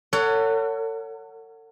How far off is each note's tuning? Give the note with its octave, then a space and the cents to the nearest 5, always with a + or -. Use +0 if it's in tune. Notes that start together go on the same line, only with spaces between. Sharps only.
A4 +40 C#5 +20 F#5 +0